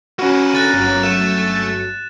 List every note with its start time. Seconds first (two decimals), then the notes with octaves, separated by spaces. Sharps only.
0.19 A#3 C#4 F#4 B4
0.53 D3 F#6 A6 D#7
0.73 G1 F#3
1.03 A3 E7